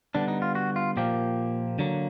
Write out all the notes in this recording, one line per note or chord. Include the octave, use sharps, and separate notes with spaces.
D3 G3 B3 D4
D#4
F4
F#4
F4
A#2 F3 A#3 G4
D3 F#3 A#3